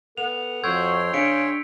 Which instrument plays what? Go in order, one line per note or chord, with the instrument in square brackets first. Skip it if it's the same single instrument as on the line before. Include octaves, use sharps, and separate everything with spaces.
[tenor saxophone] B3 [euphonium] A4 [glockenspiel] F7
[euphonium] F2 [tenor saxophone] F#4 [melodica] C#5 G5 C6 [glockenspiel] E6 G6 G#6
[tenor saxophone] C#3 [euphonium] D4 [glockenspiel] B6 C#7 D7